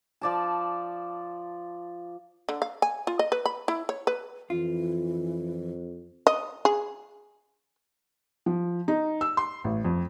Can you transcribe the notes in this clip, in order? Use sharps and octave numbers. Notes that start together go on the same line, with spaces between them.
F3 D5 A5
D3
F5
G#5
F4
D#5
B4
B5
E4
C#5
B4
F2 E3 F4
D#5
G#4
F3
D#4
E6
C6
A1
F2